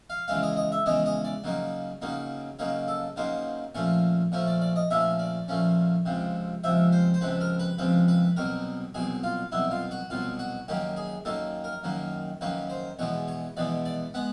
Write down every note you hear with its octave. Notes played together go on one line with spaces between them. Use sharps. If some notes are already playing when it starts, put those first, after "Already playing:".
F5
E2 C#3 E3 G#3 F5
D#5
D#5
E5
E2 C#3 E3 G#3 D#5
D#5
D5
C#3 F#3 A#3 D#4
C#3 F#3 A#3 D#4
C#3 F#3 A#3 D#4 C#5
A4
C#3 F#3 A#3 D#4 C5
A#2 F3 A3 C#4 C#5
A#2 F3 A3 C#4 C#5
D5
D5
D#5
A#2 F3 A3 C#4 E5
D5
A#2 F3 A3 C#4
C#2 C3 F3
C#2 C3 F3 E5
C5
C5
C#2 C3 F3 B4
A#4
B4
C#2 C3 F3 B4
B4
C2 B2 F#3 A#4
C2 B2 F#3 G#4
F4
C2 B2 F#3 E4
F4
F#4
C2 B2 F#3 F4
F#4
F#2 D#3 F#3 A#3 G4
G#4
F#2 D#3 F#3 A#3 A4
A#4
F#2 D#3 F#3 A#3
F#2 D#3 F#3 A#3 B4
C5
E2 B2 G#3 B3 C#5
C#5
E2 B2 G#3 B3 D5
D5
G#3 B3 F#5